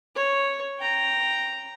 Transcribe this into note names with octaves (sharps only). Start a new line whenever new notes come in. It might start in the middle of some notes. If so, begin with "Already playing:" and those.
C#5
G5 A#5